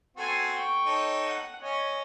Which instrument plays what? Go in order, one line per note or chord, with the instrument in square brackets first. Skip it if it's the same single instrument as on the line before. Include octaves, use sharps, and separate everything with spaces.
[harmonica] C4 F#4 [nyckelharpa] A4 G#5
[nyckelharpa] G5 C#6
[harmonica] D#4 A4 C#5
[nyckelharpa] F#5
[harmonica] C#4 [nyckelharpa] C#5 D#5